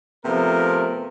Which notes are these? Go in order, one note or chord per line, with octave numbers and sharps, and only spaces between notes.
C3 F3 A3 B3 A#4